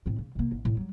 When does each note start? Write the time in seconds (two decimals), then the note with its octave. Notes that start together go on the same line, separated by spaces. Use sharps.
0.06 A2 C4
0.18 C#3
0.35 C3 A#3
0.52 A1
0.65 A2
0.77 F#3 G3